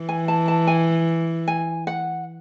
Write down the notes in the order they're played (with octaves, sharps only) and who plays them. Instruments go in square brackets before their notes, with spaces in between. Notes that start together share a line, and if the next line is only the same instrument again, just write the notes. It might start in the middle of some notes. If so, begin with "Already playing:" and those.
Already playing: [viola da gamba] E3
[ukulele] G#5
A5
A5
G#5
G#5
F#5